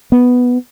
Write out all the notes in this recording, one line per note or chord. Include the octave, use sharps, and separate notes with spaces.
B3